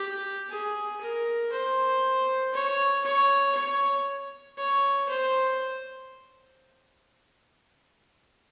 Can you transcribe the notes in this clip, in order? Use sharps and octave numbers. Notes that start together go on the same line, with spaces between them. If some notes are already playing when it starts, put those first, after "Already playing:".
Already playing: G4
G#4
A#4
C5
C#5
C#5
C#5
C#5
C5